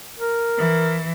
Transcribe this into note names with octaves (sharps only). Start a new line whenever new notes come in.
A#4
E3